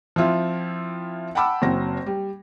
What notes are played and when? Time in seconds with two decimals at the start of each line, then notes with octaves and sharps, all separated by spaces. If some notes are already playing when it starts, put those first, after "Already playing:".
0.16 F3 C4 E4 F4
1.35 F#5 G5 A5 B5 D6 E6
1.62 F#1 F#3 C4 A#6
2.06 G3